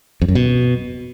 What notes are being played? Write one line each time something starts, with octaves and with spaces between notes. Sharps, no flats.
F2
F#2
B2